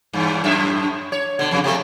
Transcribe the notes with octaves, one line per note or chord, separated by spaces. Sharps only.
E2 G2
F#2 A2 E5
C#5
B2 D3
F2 C#3
C3 A3 A4